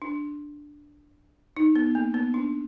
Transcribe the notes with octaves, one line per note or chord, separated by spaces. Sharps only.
D4
D#4
B3
A#3
B3
D4